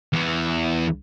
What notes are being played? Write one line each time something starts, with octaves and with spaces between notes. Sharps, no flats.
E2 E3